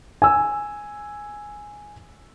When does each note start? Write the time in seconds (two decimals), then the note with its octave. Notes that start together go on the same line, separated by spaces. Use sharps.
0.22 G#5 E6